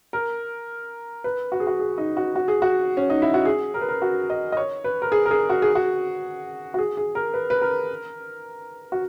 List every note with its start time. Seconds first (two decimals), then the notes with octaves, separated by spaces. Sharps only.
0.13 A#4
1.24 B4
1.52 F#4
1.60 G#4
1.67 F#4
1.80 G#4
1.98 D#4
2.17 F#4
2.36 F#4
2.48 G#4
2.62 F#4
2.97 C#4
3.10 D#4
3.22 E4
3.34 F#4
3.45 G#4
3.74 A#4
3.81 B4
3.89 A#4
4.02 F#4
4.30 D#5
4.52 D#5
4.57 C#5
4.84 B4
5.02 A#4
5.12 G#4
5.26 A#4
5.31 G#4
5.50 F#4
5.62 G#4
5.75 F#4
6.74 F#4
6.79 G#4
6.97 G#4
7.15 A#4
7.34 B4
7.50 B4
7.62 A#4
8.92 F#4